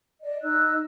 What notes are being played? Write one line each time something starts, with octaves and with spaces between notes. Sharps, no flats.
D5 D#5
D#4 D#5 E6 F#6